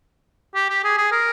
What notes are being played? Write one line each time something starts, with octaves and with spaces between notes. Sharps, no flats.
G4
G4
G#4
G#4
A#4